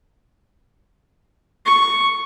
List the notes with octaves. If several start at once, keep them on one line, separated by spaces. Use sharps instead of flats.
C#6